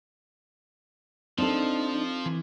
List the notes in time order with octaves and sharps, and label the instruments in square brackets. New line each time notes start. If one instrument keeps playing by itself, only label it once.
[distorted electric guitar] F3 [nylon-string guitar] C4 A4 [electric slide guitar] D4 D#4
[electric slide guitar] E3